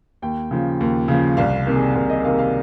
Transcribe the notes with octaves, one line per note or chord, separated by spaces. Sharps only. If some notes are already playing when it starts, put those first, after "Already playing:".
D#2 G5
C#3 F3
D#2
C#3 F3
C2 F5
C3 D#3 A#3
G#4
C2 A#4
D#5
C3 D#3 A#3 F5
F5